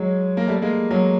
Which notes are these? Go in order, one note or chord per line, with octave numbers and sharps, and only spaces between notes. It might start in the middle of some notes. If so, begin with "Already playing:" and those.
Already playing: F#3 G#3
A#3
G3 A3
G#3 A#3
F#3 G#3